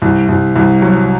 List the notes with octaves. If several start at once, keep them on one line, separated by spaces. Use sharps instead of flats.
C2
C2
C2
F#3